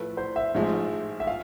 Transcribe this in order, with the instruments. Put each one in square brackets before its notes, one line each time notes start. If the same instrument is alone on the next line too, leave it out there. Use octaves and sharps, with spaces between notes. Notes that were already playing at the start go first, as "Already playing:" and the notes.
Already playing: [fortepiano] A2 F3 A3 [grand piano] B4
[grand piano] C5
E5
[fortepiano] A1 G#2 F3 G#3
[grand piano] E5
[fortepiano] F4 [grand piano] F5